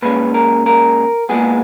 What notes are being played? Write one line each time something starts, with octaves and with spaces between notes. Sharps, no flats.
A#2 G#3 C#4 B4
A#4
A#4
A#2 G#3 B3 G#4